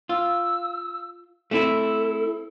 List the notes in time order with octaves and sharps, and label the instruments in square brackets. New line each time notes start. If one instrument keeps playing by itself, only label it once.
[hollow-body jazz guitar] F4 [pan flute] E6
[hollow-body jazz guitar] A3 C4 E4 [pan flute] A4